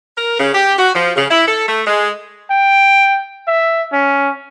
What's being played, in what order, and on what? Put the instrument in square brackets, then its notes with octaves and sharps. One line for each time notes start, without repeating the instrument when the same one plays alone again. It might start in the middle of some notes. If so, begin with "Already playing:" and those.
[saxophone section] A#4
C#3
G4
F#4
F3
C#3
E4
A4
A3
G#3
[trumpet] G5
E5
C#4